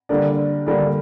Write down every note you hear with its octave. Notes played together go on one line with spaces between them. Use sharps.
D3 G3 A#3 D4
D3 G3 A#3 D4